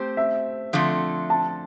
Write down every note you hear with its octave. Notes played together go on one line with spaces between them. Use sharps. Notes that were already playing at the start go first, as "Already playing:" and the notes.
Already playing: A3 C4 G4 C5
E5
D3 F3 A3 C4
A5